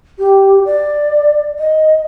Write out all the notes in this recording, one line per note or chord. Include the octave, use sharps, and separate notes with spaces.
G4
D5
D#5